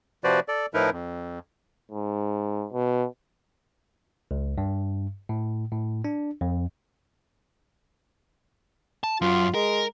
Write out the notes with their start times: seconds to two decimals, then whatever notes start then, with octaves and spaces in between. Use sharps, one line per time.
0.24 C3 F3 F#4 B4 C5 D5
0.48 A4 D5
0.74 A2 F3 D#4 E4 A#4 B4
0.92 F2
1.91 G#2
2.72 B2
4.31 C#2
4.58 G2
5.29 A2
5.72 A2
6.05 D4
6.41 F2
9.04 A5
9.22 F#2 F4
9.54 G#3 A#4